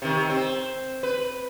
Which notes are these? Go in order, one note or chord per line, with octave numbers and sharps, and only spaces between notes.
C3 D#3
C4
B4